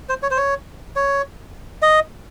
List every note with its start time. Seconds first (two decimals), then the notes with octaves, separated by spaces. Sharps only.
0.09 C5
0.23 C#5
0.31 C5
0.37 C#5
0.96 C#5
1.82 D#5